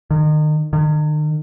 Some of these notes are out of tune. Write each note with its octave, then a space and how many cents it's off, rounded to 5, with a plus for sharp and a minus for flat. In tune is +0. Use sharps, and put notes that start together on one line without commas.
D#3 -35
D#3 -40